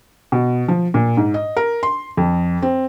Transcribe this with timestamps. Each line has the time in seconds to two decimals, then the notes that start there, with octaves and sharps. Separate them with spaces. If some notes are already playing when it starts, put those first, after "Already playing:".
0.32 B2
0.68 F3
0.94 A#2
1.17 G#2
1.34 D#5
1.57 A#4
1.83 C6
2.17 F2
2.62 C4